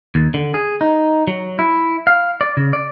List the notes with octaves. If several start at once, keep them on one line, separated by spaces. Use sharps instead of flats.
D#2
D3
G#4
D#4
F#3
E4
F5
D5
C#3
D5